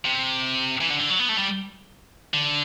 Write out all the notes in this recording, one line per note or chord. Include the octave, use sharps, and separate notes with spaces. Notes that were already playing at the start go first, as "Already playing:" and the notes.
C3
E3
D3
D3
F#3
B3
A3
G3
D3